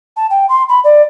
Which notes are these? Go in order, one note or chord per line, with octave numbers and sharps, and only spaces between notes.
A5
G5
C6
B5
D5